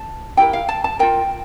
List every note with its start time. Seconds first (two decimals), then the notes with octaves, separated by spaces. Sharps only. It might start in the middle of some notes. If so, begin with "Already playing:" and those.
Already playing: A5
0.37 E4 G4 A#4 G5
0.53 F5
0.69 A5
0.84 A5
0.99 F4 A#4 G5